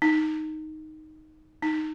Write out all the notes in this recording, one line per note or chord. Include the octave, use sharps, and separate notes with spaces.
D#4
D#4